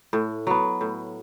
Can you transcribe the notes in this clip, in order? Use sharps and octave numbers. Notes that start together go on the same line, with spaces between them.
A2
F#3 B3
A2